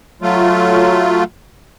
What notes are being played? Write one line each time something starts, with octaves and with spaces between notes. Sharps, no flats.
F#3 A3 F4